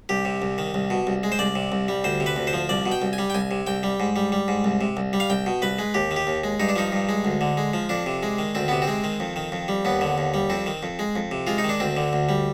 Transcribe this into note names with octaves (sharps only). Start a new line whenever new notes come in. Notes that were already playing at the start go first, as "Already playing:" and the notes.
C2 G4
C3
C2
D#3
C2
B2
C2
G#3
C5
C2 D5
C3
C2
G3
D2 C5
C3
B4
D2
C5
F3
C2 D5
B2
G5
C2
G#5
G3
G5
C2 G#5
C3
C2 G5
G3
G#2
G3
G3
G#2
C2
C3
C2
G3
F5
C2 G5
B2
C2 B4
G#3
D#2 G4
D#3
G4
D#2
G#3
G2 D#4
D4
F3 D#4
G2
G#3
D2
D3
G#3
F3
F2 D4
C3
G#3
D#3
D2 C4
C3 B3
C4
G#3
D#3
F2
D#3
F2
G3
D#2 B3
D3
D#2
G3
F2 C4
D#3
F2
G#3
F2
C3
G#3 F4
D#4
D#3
D4
D2 C4
D3
D2
G3